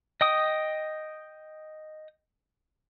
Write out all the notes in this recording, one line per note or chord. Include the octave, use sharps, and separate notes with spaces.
D#5 G5 D#6